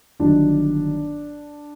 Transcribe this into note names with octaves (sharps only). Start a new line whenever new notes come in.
G1 G2 D#3 F#3 D4